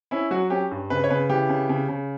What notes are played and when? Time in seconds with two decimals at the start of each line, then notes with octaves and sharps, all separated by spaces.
0.11 C#4 E4
0.31 F#3 F#4
0.50 C#4 G4
0.71 G2
0.90 C#3 B4
1.04 C#5
1.10 C#3 B4
1.29 E3 G4
1.49 C#3
1.69 C#3
1.88 C#3